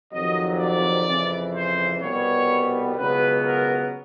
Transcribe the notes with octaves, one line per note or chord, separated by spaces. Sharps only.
F2 C3 D#3 F#3 D#5
D5
F2 C#3 E3
C5
C2 B2 G3 B3 C#5
C#2 B2 F#3 B3 B4
A#4